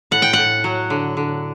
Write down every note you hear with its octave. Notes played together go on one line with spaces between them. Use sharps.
A2 F#5
G5
A2 F#5
F#3
D3
D3